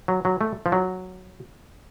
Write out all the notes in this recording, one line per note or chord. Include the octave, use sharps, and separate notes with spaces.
F#3
F#3
A3
F3
F#3